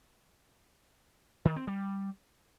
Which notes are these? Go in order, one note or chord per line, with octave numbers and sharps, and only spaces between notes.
D#3
C4
G3